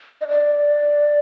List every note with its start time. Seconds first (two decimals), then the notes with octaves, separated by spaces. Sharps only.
0.21 D#5
0.29 D5